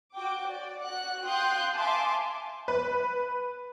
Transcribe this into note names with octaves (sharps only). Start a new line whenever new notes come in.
F#4 G5 D6
D5
F#4 F#5 F#6
F5 G5 C6 D#6 F#6 G6
E5 F5 G#5 A5 C6 D6
B4